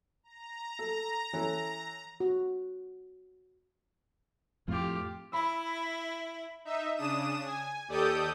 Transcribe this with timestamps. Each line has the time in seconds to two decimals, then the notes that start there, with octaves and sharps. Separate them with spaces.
0.23 A#5
0.79 A4
1.33 E3 C#4 A4
2.20 F#4
4.68 F2 A2 F4 G4
5.32 E4 B5 E6
6.65 D#4 E5
6.96 C#3 D4 D#6 E7
7.45 G#5
7.88 D#2 G4 A4 D5 D#6 G6